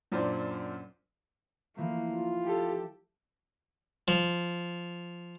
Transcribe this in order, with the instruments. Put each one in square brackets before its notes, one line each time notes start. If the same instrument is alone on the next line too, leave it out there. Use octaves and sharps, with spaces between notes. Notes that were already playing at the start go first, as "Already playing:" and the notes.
[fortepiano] F#2 A#2 D4 C5 D5
[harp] E3 F3 A3 [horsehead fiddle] A#3
[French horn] F4
[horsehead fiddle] G4 A4
[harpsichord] F3